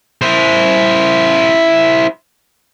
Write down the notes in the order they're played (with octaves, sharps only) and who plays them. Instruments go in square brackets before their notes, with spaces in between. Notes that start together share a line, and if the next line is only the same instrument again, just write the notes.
[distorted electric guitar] E4 C5